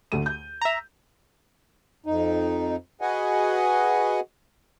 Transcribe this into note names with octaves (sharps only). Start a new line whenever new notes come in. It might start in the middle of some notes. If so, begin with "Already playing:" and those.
D2 A3 D#7
G6
E5 A#5
F2 D#4
F#4 G#4 B4 D#5 F#5 G#5